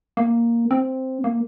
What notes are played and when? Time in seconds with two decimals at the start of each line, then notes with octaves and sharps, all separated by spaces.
0.17 A#3
0.71 C4
1.24 A#3